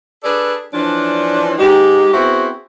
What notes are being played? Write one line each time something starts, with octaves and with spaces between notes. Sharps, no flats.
D4 G#4 A4 B4 D5
E3 F3 C#4 D4
G#2 G#3 D#4 G4
B3 C4 E4 F#4 G#4 C5